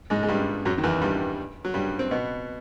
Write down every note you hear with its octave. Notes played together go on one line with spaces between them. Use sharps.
G#2 G#3
G#3
G2 G3
F#2 F#3
D#3
E2 E3
G2 G3
F#3
G2 G3
C4
B2 B3